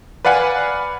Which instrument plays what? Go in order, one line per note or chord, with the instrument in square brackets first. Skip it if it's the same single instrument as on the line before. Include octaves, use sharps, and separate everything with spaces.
[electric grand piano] B4 D5 F5 F#5 G#5 B5